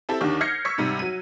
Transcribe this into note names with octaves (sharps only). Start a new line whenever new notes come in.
C4 E4 G4 A4
D#2 D3 D#3 D4 G4 C#6
F6 G6 G#6 A#6 C7 C#7
C#6 E6 G#6 B6 C#7
G#2 C3 G3
F#3 D#7